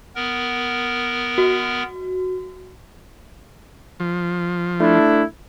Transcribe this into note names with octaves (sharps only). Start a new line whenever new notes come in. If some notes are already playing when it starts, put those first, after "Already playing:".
B3 A#4
F#4
F3
A3 D4 E4